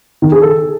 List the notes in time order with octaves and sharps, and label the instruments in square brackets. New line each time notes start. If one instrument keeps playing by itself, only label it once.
[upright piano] D#3
G#4
A4